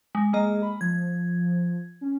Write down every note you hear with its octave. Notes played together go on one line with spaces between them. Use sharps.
G#3
G#3 A#3 G#4 D#5
B5
F3 G#6
C#4